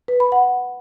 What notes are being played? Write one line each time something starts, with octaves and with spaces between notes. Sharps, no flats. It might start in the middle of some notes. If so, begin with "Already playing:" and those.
B4
B5
F#5